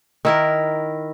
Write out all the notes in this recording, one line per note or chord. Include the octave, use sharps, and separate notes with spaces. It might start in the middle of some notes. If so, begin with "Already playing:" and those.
D#3 E4 A#4